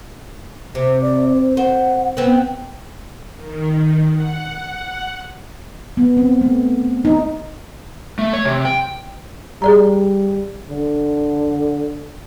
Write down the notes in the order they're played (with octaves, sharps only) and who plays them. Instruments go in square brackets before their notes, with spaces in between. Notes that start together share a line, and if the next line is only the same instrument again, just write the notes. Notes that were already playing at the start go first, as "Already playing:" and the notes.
[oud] C3 [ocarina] C5
[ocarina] D5
C5
[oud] C5 [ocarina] F#5
[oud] B3 C4
[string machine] D#3
F#5
[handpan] B3
C4
A3
D#4
[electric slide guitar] A3
C#5
C3
G5
[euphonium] G3 [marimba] G#4 D5 A#5
[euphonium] D3